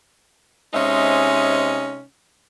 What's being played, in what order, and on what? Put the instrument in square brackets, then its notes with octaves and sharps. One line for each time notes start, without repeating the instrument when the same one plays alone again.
[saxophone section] C3 G#3 C#4 D#4 C5 E5